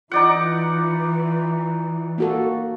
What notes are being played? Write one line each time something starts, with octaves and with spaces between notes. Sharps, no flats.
E3 D#4 F4 D5 F#5
A#3 F#4 A4